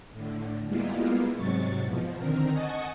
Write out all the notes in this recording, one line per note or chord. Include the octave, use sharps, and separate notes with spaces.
A2 D3
G3 G#3 A#3 B3 E4 F4
G#2 C3 F#3 C#6 A6
E2 B2 F3
D3 D#3 C4 A#4
D#5 F#5 G#5 A5 C#6 D#6